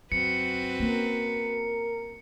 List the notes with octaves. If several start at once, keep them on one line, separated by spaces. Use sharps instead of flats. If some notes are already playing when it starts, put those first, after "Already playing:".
F#2 F#3 C4 F#4 B4 C#7
A#3 C#4 A#4